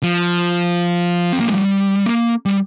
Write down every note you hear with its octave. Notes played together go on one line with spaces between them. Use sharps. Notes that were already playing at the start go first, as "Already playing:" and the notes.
F3
C4
A#3
G#3
G3
A#3
G3